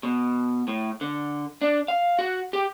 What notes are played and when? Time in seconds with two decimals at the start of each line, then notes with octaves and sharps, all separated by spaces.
0.03 B2
0.68 A2
1.01 D3
1.62 D4
1.88 F5
2.19 F#4
2.53 G4